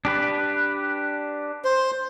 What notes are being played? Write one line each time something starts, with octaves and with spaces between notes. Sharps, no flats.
D4 G4 B4
C5